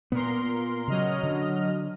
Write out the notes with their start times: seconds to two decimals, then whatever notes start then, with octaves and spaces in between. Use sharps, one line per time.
0.12 A#2 B3 A#4 C6
0.88 C#3 F#3 D#5 F6
1.23 D3